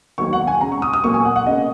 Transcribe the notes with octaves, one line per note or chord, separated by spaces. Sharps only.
D#3 F#3 A#3 C#6
F#5
G#5
C#3 G#3 A#5
C#6
D#6
D#6
A#2 F#3 A#3 C#6
G#5
F#5
F#5
C#3 A#3 D#5